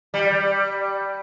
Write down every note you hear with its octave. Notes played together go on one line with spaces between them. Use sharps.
G3